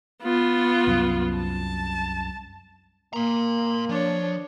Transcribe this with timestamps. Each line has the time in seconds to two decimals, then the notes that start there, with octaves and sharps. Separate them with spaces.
0.24 B3 F4
0.87 C2 F#2
1.36 A5
3.13 A#3 A#5 C6
3.89 F3 D4 C#5